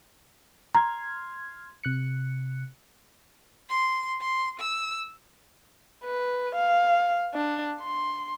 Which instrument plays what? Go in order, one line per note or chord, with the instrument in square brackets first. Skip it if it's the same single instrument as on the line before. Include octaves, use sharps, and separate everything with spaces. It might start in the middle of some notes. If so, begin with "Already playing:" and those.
[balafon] A#5 [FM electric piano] C6 F6 G#6
[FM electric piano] C3 F#6 C#7
[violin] C6
C6
E6
[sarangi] B4
F5
D4
C6